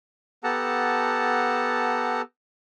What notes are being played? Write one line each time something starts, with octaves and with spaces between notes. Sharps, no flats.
B3 G4 A4 F#5 A5 A#5